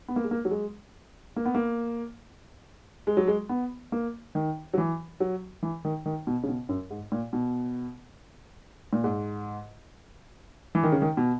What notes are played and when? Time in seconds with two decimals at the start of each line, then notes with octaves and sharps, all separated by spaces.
0.08 B3
0.16 A#3
0.24 G#3
0.31 A#3
0.45 F#3
0.51 G#3
1.36 A#3
1.45 B3
1.55 A#3
3.07 G#3
3.17 F#3
3.28 G#3
3.49 B3
3.92 A#3
4.35 D#3
4.74 F#3
4.78 E3
5.20 F#3
5.63 E3
5.85 D#3
6.06 D#3
6.27 B2
6.43 C#3
6.48 B2
6.69 F#2
6.91 G#2
7.12 A#2
7.33 B2
8.93 A#2
9.04 G#2
10.75 E3
10.83 D#3
10.92 C#3
11.02 D#3
11.17 B2